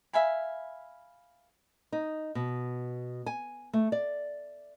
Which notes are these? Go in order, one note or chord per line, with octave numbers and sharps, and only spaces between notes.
E5 F5 G#5 B5
D#4
B2
G#5
A3
D5